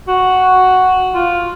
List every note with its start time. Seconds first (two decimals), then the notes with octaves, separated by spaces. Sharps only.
0.08 F#4
1.15 F4